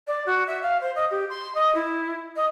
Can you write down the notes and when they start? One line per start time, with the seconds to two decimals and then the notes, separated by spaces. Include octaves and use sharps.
0.07 D5
0.26 F#4
0.47 E5
0.62 F5
0.81 C5
0.96 D#5
1.11 G4
1.30 C6
1.55 D#5
1.75 E4
2.36 D#5